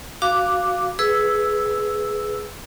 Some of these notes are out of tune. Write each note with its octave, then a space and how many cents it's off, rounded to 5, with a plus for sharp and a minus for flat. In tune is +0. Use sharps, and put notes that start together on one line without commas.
F#4 +0 F5 +0 D6 +0
G#4 +10 B4 +0 E6 +0